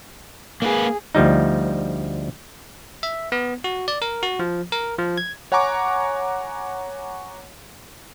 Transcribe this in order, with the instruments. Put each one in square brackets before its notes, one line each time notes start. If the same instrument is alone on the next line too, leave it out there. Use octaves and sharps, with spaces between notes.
[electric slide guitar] A#3 B4 [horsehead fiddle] G#4
[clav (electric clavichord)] D2 F3 G3 D#4
[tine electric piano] E5
B3
F#4
D5
A#4
F#4
F3
A#4
F3
G#6
[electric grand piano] C#5 F#5 G#5 A#5 C#6 D6